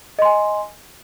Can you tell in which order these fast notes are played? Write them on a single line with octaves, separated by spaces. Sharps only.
D#5 C6 G#5